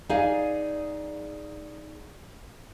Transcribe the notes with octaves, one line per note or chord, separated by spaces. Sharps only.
D#4 G#4 D5 F5 G#5